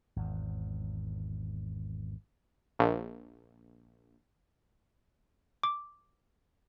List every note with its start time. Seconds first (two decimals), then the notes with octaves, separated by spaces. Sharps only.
0.16 G#1 E2
2.79 A#1
5.63 D6